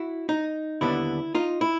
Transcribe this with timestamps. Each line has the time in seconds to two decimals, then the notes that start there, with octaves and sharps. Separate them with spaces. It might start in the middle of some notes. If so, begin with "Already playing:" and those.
Already playing: E4 F#4
0.29 D#4
0.81 D#2 D3 G3 B3 D4 E4
1.35 D#4 F4
1.61 E4